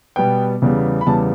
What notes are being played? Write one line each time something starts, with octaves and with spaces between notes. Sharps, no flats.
B2 G3 B3 G5
E2 C#3 G3 B3
B5
E2 C#3 G3 B3 A5